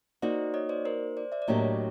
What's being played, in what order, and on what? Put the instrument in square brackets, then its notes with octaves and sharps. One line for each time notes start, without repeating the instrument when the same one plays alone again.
[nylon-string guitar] A#3 D#4 F#4 [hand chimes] C5 D5
[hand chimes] C#5 D#5
C5 D5
A#4 C5
C5 D5
D5 E5
D5
[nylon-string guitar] A2 F#3 A#3 D4 G4 [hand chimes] C#5 D#5